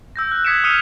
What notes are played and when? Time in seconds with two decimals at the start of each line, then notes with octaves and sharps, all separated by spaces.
0.16 E6 G6 A#6
0.31 F#6
0.45 D#6 G#6 B6 C#7 D7 E7
0.64 D#6 F6 G#6 C#7 D#7 F7